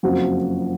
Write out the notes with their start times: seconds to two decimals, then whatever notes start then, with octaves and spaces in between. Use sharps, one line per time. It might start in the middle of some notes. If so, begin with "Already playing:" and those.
0.03 F#1 F2 C#3 F3 F#4